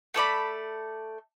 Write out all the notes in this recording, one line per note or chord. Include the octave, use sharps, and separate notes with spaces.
A3 A4 D5 B5